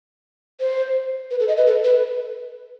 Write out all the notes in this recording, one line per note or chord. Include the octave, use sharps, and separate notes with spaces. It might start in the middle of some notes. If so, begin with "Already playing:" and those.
C5
B4
A4
D#5
B4
A4
B4